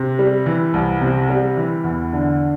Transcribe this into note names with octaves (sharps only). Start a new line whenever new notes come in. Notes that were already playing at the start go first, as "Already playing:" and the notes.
Already playing: C3
G3
E3
C2
C3
G3
E3
E2
D3